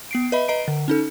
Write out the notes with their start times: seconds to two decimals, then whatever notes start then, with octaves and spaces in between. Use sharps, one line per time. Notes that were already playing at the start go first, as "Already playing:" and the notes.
0.11 B3 C7 D7
0.32 B4 D#5 E5 B5
0.48 B4 D#5 A#5 C7 D7
0.68 D3
0.88 C#4 D#4 A4